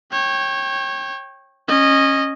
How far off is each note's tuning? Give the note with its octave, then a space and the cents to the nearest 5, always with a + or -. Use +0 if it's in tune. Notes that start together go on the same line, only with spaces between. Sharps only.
C#5 -25 G5 +0
C#4 -15 D#5 -15